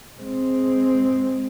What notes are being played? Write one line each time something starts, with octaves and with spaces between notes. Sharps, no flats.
G#3 C4